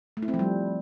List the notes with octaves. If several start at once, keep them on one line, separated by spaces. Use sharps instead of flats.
A3
E4
C4
F3
G3